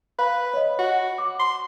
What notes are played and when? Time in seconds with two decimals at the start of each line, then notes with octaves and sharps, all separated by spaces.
0.19 B4 F5
0.54 C#5 D#5
0.79 F#4
1.18 D6
1.39 C6